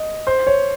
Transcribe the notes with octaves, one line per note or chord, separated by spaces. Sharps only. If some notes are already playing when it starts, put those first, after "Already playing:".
Already playing: D#5
C5
C#5